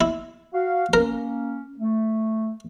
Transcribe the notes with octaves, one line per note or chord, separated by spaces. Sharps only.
E4
F#4 F5
A#3 C#4 A#4
A3